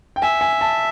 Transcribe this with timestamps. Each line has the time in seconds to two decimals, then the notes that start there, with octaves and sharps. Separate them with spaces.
0.16 G5
0.22 E5 G#5
0.41 G#5
0.61 A5